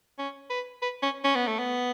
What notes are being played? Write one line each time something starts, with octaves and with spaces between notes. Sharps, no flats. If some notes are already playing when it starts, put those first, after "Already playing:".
C#4
B4
B4
C#4
C#4
B3
A3
B3